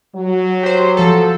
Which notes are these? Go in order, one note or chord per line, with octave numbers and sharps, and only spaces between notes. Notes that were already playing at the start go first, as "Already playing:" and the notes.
F#3
G4 C5
F3 A4